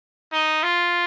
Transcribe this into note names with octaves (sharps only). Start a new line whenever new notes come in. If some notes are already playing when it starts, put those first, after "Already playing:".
D#4
F4